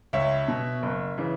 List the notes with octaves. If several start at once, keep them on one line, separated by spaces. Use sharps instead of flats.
C#2 C#5 E5
B2
F#1
C#3 E3